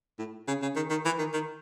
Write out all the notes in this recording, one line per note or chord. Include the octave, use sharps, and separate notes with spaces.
A2
C#3
C#3
D#3
D#3
E3
D#3
D#3